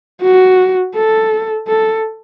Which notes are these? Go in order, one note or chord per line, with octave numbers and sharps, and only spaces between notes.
F#4
A4
A4